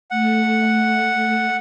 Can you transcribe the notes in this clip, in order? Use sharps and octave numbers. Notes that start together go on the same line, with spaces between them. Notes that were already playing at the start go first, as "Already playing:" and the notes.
A3 F#5